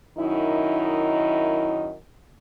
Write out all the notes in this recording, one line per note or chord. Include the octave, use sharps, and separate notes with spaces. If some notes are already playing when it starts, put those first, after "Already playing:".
F#2 D#3 D#4 E4